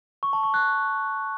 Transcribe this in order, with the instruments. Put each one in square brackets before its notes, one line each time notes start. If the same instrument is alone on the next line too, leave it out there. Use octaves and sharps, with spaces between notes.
[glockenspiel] C#6
A5
C#6
F#6